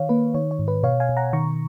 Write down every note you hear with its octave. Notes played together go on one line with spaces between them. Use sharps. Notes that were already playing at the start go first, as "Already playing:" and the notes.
Already playing: D#3 C#5 F5
A#3 B4
D#3 C#5
C#5
G#2
B4
B2 C#5 F5
F5 G#5
B2
F#5 A#5
D#3 A#5 C#6